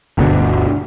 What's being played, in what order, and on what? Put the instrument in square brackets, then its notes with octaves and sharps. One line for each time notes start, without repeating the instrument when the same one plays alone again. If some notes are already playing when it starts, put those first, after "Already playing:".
[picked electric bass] G1 D2 B2 D3